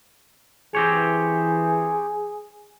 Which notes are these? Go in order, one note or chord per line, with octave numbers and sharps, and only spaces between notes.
E3 C4 G4 G#4 C#5